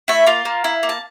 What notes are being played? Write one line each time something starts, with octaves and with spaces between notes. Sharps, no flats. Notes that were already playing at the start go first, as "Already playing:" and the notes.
A3 E4 E5
A#3 F4 F5
A#3
E4
A#3
A5